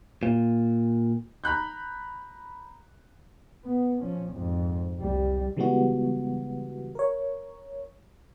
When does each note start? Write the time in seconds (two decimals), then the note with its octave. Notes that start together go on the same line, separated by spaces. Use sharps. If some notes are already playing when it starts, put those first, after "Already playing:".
0.23 A#2
1.44 A#5 B5 F#6 G6
3.64 B3
4.01 F3 C#4
4.33 F2 G#2
4.98 C2 G3
5.57 C#3 E3 G3 G#3 B3 F#4
6.95 A#4 C#5